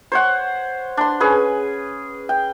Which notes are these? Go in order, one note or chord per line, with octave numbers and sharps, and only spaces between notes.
C5 C#5 F#5
D4 C6
C#4 G#4 B4
G5